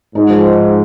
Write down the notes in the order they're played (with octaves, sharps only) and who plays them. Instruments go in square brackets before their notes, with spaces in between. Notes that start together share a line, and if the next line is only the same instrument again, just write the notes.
[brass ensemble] G#2 [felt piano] D#4
[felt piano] F3